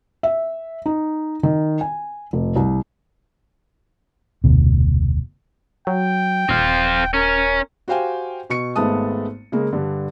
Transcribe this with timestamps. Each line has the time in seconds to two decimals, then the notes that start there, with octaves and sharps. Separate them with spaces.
0.23 E5
0.86 D#4
1.43 D#3
1.81 G#5
2.33 F1
2.56 C2
4.44 F1 D2 B2
5.87 F#3 G5
6.49 D#1 C4 F4
7.14 C#4 A#4
7.88 F#4 G4 C5 F5 G5 G#5
8.50 B2 C#6 C#7
8.76 G#1 G#3 A3 B3 A5 D#6
9.52 C#3 G#3 A#3
9.73 G2 D3